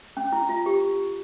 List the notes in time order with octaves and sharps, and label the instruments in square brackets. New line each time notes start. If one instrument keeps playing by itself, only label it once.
[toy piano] C#4
E4
F4
G4